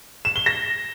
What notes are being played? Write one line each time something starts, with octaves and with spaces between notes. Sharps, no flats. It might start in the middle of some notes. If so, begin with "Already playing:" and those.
E7
G7
A#6